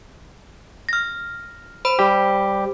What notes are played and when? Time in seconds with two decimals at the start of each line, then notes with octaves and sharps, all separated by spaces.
0.89 F6 A#6
1.85 C5 B5
1.99 G3 G4